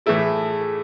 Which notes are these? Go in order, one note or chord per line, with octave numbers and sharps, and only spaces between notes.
A2 E3 A3 E4 G#4
A4
G#4
G#4
A4